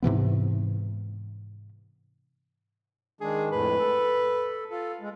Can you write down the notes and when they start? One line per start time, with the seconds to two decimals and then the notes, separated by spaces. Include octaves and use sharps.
0.02 G#2 C3 E3 B3
3.21 D#3 G#3 D4 G#4
3.52 F2 A2 B4
3.79 A4
4.70 F4 A4
5.01 G#3